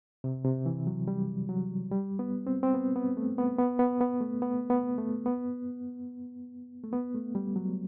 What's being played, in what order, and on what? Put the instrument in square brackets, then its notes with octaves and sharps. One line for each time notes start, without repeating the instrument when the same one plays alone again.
[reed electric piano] C3
C3
E3
F#3
G3
F#3
G3
B3
C4
C4
B3
B3
A3
B3
B3
B3
B3
A3
B3
B3
A3
B3
A3
B3
A3
G3
F#3